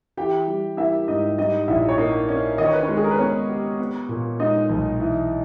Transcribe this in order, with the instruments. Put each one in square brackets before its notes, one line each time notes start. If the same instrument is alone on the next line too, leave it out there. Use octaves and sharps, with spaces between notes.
[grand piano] E3 [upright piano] G4 G5
[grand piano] G3
[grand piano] A#3 [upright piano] E4 E5
[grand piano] G#2 [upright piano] D#4 D#5
[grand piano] G3 [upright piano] D#4 D#5
[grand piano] A#1 [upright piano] E4 E5
[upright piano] C#5
[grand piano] A#3 [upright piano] D#4 D#5
[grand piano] C#4
[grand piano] D#3 [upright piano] D#5
[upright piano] C#5
B4
C#4 C#5
[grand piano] G#3
[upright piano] G#4
A#4
B4
[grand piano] B3 [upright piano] C#4 C#5
[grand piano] G4
B3
A#2
[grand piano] G#3 [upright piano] D#4 D#5
[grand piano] B1
E3